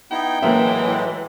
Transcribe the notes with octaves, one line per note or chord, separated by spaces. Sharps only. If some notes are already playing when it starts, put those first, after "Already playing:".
B3 D#4 E4 G5
A2 E3 F#3 G#3 A#3 E4 E5